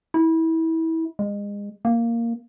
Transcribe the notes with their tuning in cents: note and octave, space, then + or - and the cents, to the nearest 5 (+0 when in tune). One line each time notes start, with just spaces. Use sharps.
E4 -25
G#3 -30
A#3 -5